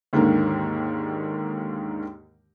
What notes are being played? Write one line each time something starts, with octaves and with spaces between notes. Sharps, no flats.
D#2 G#2 D3 D#3 A#3